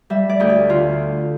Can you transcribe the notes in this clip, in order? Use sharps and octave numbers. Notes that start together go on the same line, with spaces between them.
G3 E5
D5
D2 G4
A4
D3 F4